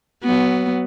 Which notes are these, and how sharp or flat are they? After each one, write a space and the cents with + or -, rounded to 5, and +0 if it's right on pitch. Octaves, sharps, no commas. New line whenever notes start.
F#3 +25 B3 +0